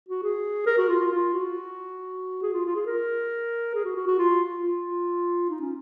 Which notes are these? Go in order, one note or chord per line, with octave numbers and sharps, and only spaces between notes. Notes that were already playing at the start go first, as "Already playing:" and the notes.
F#4
G#4
A#4
F#4
F4
F4
F4
F#4
G#4
F4
F4
G#4
A#4
G#4
F#4
F#4
F#4
F4
F4
D#4
C#4